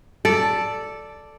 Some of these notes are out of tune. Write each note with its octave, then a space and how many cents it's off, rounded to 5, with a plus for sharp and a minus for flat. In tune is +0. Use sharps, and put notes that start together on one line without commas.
A4 +0 D5 +0